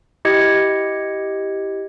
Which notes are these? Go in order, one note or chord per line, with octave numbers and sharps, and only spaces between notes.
E4 G4 D#5 G#6 C#7